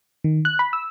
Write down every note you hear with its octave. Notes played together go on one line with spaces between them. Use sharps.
D#3
F#6
B5
E6